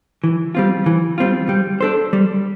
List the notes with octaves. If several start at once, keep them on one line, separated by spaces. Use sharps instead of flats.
E3
G3 C4 F4
E3
G3 C4 F4
G3
D4 A4 C5
G3